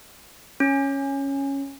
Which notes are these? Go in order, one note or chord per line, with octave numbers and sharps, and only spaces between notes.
C#4